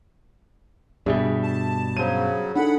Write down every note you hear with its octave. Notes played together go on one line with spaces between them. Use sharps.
G2 B2 G3 D4 G#4 E5
A5
C#3 F#3 C5 D#7
D4 D#4 A4 F#5 B5